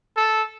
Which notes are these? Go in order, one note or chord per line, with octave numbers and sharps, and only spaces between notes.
A4